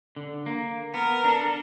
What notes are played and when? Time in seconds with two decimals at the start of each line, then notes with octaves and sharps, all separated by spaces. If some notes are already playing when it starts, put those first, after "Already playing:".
0.16 D3
0.46 A#3
0.94 B3 A#4
1.24 D4 A4